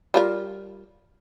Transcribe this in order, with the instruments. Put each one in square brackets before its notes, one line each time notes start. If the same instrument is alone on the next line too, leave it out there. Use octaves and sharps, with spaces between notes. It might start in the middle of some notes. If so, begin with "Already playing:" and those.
[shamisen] G3 F4 A#4